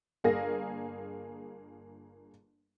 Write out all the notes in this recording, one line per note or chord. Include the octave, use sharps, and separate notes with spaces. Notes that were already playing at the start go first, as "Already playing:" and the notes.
G1 A#3 G#4 A#4 A#6